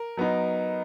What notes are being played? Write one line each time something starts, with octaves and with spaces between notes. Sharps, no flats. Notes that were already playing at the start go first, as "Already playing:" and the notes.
Already playing: A#4
F#3 B3 D#4